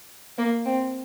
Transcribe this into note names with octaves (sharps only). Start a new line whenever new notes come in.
A#3
C4